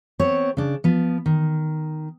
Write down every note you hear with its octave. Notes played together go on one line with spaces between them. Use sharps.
B3 C4 C#5
C#3 D4
F3 B3
D#3